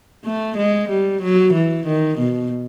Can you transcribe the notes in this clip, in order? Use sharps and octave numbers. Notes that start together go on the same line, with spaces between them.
A3
G#3
G3
F#3
E3
D#3
B2